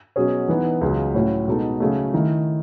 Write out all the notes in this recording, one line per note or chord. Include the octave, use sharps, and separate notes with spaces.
B2 F#3 C#4 G#4
E3 B3 D#4
C#2 C#3 F#3
A2 F#3 C#4 E4
B2 G#3 D#4 A4
C#3 F#3 A3
D#3 A3 E4